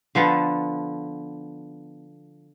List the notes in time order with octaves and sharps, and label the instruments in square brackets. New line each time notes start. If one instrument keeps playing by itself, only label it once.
[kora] D3 F3 B3 A4